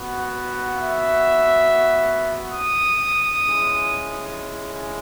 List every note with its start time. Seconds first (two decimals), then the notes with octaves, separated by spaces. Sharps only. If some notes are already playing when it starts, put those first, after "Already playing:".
Already playing: B3 F#4
0.76 E5
2.52 D#6
3.41 G#3 C#4 E4